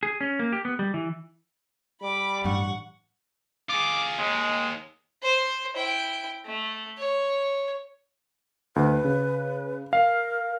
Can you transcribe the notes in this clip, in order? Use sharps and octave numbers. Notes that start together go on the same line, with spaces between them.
G#4
C#4
A#3
G4
B3
G3
E3
G3 B5 D6
A1 G2 F#5 C#6
F4 G#4 D6
D#2 G#3
C5
E4 G5
A3
C#5
D2 B4
C#3
A#4 F5